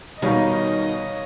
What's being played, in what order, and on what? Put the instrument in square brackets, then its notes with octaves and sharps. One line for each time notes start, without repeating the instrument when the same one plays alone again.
[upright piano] B2 G3 D#4 [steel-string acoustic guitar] D#3 [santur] C#5 F5 A#5 [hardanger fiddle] D#5